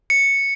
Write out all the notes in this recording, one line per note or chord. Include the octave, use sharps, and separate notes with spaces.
C#7